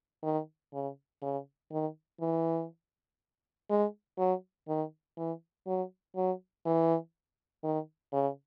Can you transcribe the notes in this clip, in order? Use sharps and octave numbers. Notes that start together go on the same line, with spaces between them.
D#3
C#3
C#3
D#3
E3
G#3
F#3
D#3
E3
F#3
F#3
E3
D#3
C#3